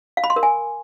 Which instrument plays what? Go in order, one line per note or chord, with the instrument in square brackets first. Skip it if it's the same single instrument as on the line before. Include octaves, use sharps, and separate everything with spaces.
[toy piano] F5
B5
C6
A#4
G#5